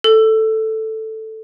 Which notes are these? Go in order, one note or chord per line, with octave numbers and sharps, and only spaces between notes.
A4